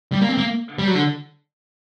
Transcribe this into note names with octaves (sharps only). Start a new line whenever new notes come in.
G3
A#3
C4
A#3
G3
F#3
D3